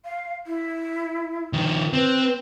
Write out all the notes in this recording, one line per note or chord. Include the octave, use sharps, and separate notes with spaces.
F5
E4
D#3 F3
C4 B4